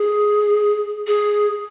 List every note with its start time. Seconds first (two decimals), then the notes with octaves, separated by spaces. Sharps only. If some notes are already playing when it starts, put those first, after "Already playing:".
Already playing: G#4
1.07 G#4